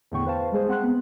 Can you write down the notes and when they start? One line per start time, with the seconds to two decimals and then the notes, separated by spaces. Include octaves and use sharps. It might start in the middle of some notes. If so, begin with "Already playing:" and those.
0.12 E2 A2 D3 B3 G5 C#6
0.26 B4 C5 F5 A5
0.52 G3 G#3 G#4 C5
0.68 C4 F#5 C6 F#6
0.83 B3